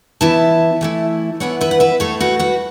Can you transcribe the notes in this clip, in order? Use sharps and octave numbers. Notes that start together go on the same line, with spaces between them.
E3 B3 E4 E5 A5
E3 A3 E4
E3 B3 E4 C#5 F#5
B4 E5
F#5
B4 E5
A2 A3 E4 A4 C#5
F#4 B4
F#4 B4